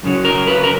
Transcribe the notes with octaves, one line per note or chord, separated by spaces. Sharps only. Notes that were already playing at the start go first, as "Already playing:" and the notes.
F#2 C#3 F#3
A#4
B4
A#4